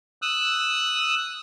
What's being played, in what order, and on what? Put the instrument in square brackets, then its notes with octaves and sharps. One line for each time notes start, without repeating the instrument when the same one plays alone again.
[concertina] D#6 E6 F#6